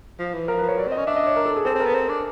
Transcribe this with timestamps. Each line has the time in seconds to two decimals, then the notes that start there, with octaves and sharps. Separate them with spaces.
0.19 F3
0.34 E3
0.48 F3 A#4
0.58 B4
0.63 F3
0.68 C#5
0.77 F#3 D5
0.87 C4
0.92 D#5
0.98 C#4
1.07 D4 E5
1.16 D#5
1.26 C#5
1.36 A#4
1.46 A4
1.56 G#4
1.65 C4 A4
1.75 C4
1.80 A#4
1.85 B3
1.94 C4
2.09 D4